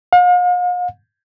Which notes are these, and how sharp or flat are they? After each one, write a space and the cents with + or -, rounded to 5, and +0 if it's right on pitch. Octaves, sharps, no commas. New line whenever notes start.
F5 +45